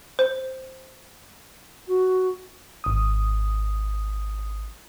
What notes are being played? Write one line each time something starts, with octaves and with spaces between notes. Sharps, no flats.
C5
F#4
G#1 D#6